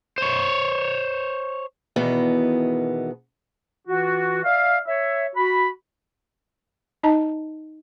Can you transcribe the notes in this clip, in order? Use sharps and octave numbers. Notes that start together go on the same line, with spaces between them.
C5 C#5
E2 B2 D#3 E3 B3
E3 F4 F#4
D5 E5 F5
C#5 E5
F#4 B5
D#4 D#5 A5 A#5